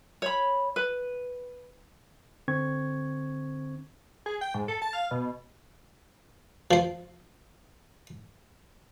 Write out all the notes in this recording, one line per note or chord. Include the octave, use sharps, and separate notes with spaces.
C#5 B5
B4
D3 C4 C#6 G#6
G#4
G5
G#2
A4
A5
F5
B2
F3 C5